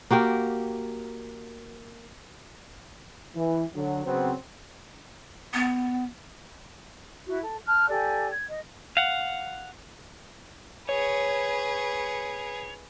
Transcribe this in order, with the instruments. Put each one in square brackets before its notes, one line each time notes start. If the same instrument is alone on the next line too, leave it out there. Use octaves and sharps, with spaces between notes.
[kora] A#3 F#4 G4 A#4
[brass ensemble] E3
D3 F#3
C#3 F#3 B3 C4
[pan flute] B3
[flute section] E4 F#4
A4
A5 F6 F#6
G4 A4 D5 G#5
G#6
D#5
[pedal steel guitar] F5 F#5
[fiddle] G#4 B4 [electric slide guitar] C#5